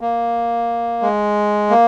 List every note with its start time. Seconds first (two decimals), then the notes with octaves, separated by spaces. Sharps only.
0.01 A#3
1.02 G#3
1.70 A#3